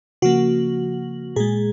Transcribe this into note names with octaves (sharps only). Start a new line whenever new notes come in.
C#3 F3 A#3 F#4
A#2 G#3 G#4